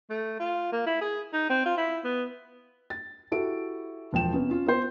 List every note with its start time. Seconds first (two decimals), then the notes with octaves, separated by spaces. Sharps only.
0.10 A3
0.40 F4
0.72 A#3
0.86 E4
1.01 G#4
1.33 D#4
1.50 C4
1.66 F4
1.78 E4
2.05 B3
2.90 A6
3.32 E4 F#4 G4 A4 D7
4.13 E1 F3 G5 E7
4.33 C3 B3 C#4
4.49 C#4 F4
4.66 B3 C5